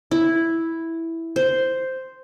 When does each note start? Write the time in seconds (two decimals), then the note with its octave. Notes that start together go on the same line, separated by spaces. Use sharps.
0.11 E4
1.36 C5